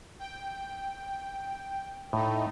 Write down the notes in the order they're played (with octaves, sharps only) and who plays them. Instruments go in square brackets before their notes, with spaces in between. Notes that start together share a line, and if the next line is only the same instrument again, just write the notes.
[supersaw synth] G5
[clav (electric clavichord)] A2 [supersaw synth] A3 D#4